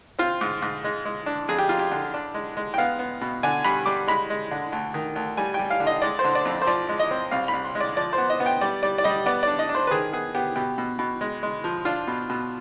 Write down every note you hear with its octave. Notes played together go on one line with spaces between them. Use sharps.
C4 F4
G#2
G#2
G#3
G#3
D4
F2 G#4
G4
F2 F4
G4
D3
D4
G#3
G#3
G5
B3 F5
B3
B2
D3 G#5
G2 B5
G3 D6
G#3 B5
G#3
D3
D2
D#3
D2
G3 G#5
G3 G5
F5
D3
D#5
G#3 D5
C5
D3
D5
F2
C5
F3 D5
G#3
D#5
C4
C2 F5
B5
C2
C6
G#3
D5
F3 D5
C5
B3
D#5
B3
G5
G3 D5
G3 D5
D5
G3 D#5
B3 D5
D4 D5
D#5
D4
C5
B4
D#3 G#4
B3 G#4
B3 G4
B2 G4
B2
B2
G#3
G#3
F3
D4 F4
B2
B2